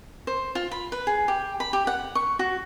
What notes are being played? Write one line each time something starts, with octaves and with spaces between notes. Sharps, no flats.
C5
F4
B5
B4
G#4
G4
B5
G4
F#5
C#6
F#4